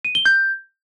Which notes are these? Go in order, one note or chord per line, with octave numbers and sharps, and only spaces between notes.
D#7
G7
G6